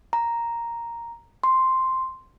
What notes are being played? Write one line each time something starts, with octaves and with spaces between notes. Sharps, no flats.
A#5
C6